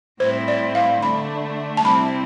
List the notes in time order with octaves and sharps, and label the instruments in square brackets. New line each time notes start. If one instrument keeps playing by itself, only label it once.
[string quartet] A2 G3 C4 E4 [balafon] C5
[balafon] D5
F5
[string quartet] D3 A3 D4 [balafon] B5
[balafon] A5
[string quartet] C3 G3 C4 E4 [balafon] B5